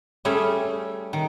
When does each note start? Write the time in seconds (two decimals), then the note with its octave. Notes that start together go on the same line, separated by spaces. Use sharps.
0.25 G3 A3 C#4 G#4
1.13 D#3